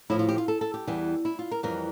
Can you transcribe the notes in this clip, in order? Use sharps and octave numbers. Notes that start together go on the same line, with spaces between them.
A2 F3 E4
F4
G4
F4
A4
A4
G4
E2 E3 G3
E4
F4
A#4
F2 E3 G3 A#4